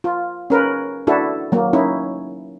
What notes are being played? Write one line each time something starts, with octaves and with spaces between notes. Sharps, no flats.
F4
C#4 A#4 B4
D4 E4 F#4 A4
F#3 A#3
C#4 D#4 E4